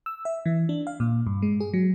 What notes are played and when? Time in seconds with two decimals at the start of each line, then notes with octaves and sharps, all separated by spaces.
0.06 E6
0.25 E5
0.46 E3
0.69 D4
0.87 F5
1.00 A#2
1.27 G2
1.42 G#3
1.61 G#4
1.74 F#3